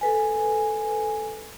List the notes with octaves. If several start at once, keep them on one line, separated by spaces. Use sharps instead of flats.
A4 B4 G#5